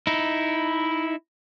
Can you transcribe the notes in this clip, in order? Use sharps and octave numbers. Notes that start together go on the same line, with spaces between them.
D#4 E4